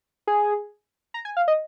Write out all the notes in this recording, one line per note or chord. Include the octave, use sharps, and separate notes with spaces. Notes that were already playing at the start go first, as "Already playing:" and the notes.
G#4
A#5
G#5
F5
D#5